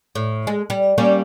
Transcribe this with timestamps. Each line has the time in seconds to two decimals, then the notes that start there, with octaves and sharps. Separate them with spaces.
0.15 A2
0.47 G#3
0.70 G3
0.98 G3 A#3 C#4